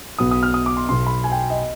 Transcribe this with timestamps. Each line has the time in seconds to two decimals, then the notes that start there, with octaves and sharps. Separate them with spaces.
0.19 B1 B2 B3 D#6
0.31 D#6
0.43 F6
0.54 D#6
0.66 D6
0.77 C6
0.88 B1 B2 B3 C6
1.06 B5
1.24 G#5
1.32 G5
1.50 D#5